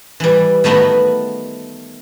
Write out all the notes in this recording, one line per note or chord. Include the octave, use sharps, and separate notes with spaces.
E3 G3
D#3 A3 B3 F#4 B5